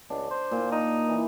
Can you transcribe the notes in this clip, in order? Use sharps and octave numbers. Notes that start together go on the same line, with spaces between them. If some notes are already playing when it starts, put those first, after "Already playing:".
C#2 D4
C5
A#2
D#4
E3